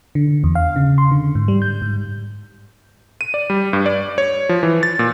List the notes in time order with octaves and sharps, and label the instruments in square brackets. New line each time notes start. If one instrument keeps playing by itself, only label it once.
[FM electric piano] D3
E2
F5
C#3
C6
D3
G#2
G3
G6
G#2
[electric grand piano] D#7
D5
G3
G2
D5
C#5
F3
E3
A6
A#2